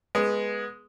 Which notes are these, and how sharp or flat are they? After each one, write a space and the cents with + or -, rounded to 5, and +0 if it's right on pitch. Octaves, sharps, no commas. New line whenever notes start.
G#3 +0 B3 -15